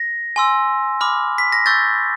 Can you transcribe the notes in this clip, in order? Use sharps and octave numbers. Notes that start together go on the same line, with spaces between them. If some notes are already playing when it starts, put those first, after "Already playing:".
Already playing: A#6
G#5 C6 E6
B5 D6 F6
B6
A#6
C#6 E6 G6 A6